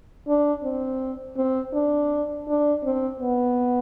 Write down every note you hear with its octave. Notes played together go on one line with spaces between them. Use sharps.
D4
C4
C4
D4
D4
C4
B3